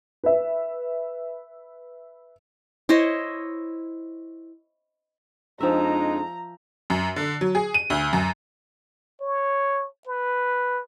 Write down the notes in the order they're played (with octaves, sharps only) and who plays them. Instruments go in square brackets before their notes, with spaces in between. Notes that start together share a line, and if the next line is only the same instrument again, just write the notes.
[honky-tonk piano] B4 E5
[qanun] E4 C5 C#5 D#5
[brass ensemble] F2 G#3 D#4 [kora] F3 E5 [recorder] D4 [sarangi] A#5
[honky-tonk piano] F#2
D3
F#3
G#4
D#7
D2
F#2
[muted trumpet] C#5
B4